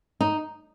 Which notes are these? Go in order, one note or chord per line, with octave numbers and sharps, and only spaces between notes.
D#4